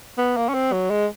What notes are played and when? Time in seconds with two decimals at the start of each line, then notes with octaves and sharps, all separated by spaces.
0.18 B3
0.37 A#3
0.49 C#4
0.54 C4
0.73 F#3
0.90 G#3